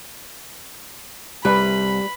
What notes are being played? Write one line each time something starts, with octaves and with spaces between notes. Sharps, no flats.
C2 G3 B4 B5